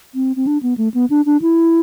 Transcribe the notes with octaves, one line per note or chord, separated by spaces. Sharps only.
C4
C4
D4
B3
A3
B3
D4
D4
E4